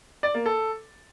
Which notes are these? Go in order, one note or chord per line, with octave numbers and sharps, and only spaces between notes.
D5
A#3
A4